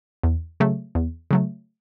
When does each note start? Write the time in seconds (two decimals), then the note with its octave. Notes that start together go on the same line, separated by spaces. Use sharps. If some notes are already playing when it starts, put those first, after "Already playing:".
0.23 E2
0.60 C#3 F#3 A3
0.95 E2
1.31 C#3 F#3 A3